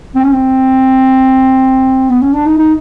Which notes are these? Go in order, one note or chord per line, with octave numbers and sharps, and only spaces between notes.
C4
C#4
C4
B3
C#4
D4
D#4
D#4